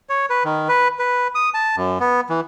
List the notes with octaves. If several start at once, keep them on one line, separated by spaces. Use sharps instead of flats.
C#5
B4
D#3
B4
B4
D#6
A5
F#2
B3
E3